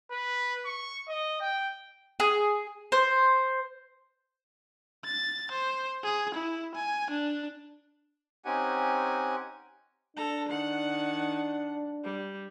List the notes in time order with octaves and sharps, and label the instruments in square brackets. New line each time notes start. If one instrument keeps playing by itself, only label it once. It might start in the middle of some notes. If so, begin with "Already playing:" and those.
[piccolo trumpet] B4
C#6
D#5
G5
[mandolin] G#4
C5
[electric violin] A6
C5
G#4
E4
G#5
D4
[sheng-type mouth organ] C4 C#4 D#4 G4 F#5 G#5
[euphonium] D4 [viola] A4 A#5
[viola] D#3 F#5
G3